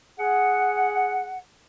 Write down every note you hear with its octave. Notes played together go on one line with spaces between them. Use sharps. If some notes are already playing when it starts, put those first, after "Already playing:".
G#4 F#5